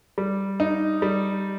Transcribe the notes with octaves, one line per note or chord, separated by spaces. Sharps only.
G3
D#4
G3